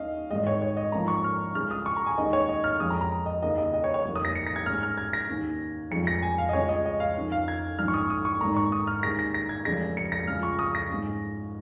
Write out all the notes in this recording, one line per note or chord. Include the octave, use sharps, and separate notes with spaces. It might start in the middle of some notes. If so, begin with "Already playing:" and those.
Already playing: D#2 D#3 C#4 D#5 F5
G#1 G#2 G#3 D#5
C#5
C#5
D#5
G#2 F3 A#3 C#4 A#5
C#6
F6
C#2 C#3 G#3 C#4 F6
D#6
C#6
A#5
G#5
D#2 D#3 G#3 C#4 D#5
C#5
D#5
F6
F2 F3 G#3 C#4 D#6
A#5
A#5
D#5
D#2 C#3 A#3 D#5
D#5
D#5
C#5
C#5
F1 D#2 D#3 A#3
D#6
A#6
C#7
A#6
G#6
G#2 G#3 C#4 F6
F6
G#6
A#6
D#2 D#3 A#3 C#4
F1 F2 F3 G#3 C#4 C#7
A#6
G#5
F5
D#5
C#2 C#3 G#3 C#4 C#5
D#5
D#5
F5
F2 D#3 C#4
F5
G#6
A#1 G#2 D#3 C#4 F6
C#6
D#6
D#6
C#6
G#1 G#2 D#3 A#3 C#4 A#5
C#6
D#6
F6
D#2 D#3 G#3 C#4 A#6
A#6
A#6
G#6
F1 F2 C#3 G#3 C#4 A#6
C#7
A#6
C#2 C#3 F3 F6
C#6
D#6
A#6
G#2 G#3 C#4